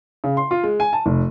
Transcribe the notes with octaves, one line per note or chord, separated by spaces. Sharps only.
C#3
C6
F4
G#3
G#5
A5
F1